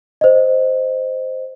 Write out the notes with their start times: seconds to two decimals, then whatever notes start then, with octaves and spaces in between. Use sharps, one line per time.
0.21 C5 D#5